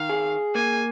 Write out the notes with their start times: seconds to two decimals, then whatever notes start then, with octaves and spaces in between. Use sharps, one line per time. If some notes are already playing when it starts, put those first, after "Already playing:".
Already playing: D#3 F5
0.10 G#4
0.55 A#3 G#5